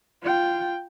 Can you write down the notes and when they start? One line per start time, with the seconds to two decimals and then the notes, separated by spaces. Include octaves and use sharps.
0.22 F4 G5